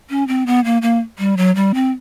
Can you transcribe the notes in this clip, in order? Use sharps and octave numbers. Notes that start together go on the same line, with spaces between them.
C#4
C4
B3
A#3
A#3
G3
F#3
G3
C4